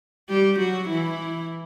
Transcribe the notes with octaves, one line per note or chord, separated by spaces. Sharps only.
G3 G4
F#3 F#4
E3 E4